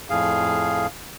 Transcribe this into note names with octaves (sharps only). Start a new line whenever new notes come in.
F2 A2 G#4 F5